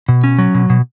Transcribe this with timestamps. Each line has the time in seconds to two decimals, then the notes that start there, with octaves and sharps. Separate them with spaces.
0.09 B2
0.24 C#4
0.39 F#3
0.54 B2
0.70 B2